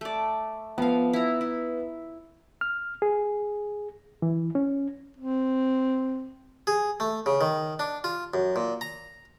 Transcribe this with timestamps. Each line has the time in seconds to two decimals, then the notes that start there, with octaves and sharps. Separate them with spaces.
0.01 A3 D5
0.78 F3 B3 F5
1.13 E4 A#5
1.41 E4
2.61 F6
3.02 G#4
4.22 E3
4.55 C#4
5.17 C4
6.67 G#4
7.00 A3
7.26 C#3
7.41 D#3
7.79 D4
8.04 F4
8.34 F#2
8.56 A#2
8.81 A#5